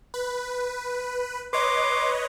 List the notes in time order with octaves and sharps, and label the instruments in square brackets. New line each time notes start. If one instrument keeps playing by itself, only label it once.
[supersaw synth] B4
[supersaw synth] B4 C#5 D#5 [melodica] C6 D6